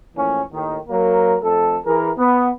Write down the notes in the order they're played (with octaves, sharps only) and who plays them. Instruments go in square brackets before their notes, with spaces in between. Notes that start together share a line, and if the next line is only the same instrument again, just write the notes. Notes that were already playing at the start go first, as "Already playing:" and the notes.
[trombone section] A2 E3 F3 A#3 C#4
D#2 A2 D#3
F#3 A#3 A#4
F2 A3 A4
E3 G#4 A#4
B3